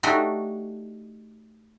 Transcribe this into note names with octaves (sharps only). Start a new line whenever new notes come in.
A3 D4 D#4 F#4 G4